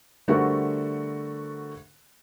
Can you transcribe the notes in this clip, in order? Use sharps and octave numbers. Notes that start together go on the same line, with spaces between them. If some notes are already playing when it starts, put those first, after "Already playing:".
D3 G3 A3 F#4 A#4 C5